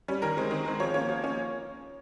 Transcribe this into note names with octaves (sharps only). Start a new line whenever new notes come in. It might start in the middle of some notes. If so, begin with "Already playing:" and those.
G3 C#4
D#3 A#4
G#3 C4
D#3
G#3 C4
F3 C#5
A#3 C#4 C#5
F3
A#3 C#4